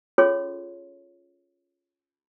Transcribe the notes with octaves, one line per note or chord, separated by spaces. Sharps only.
C#4 F4 G#4 A4 C#5 C6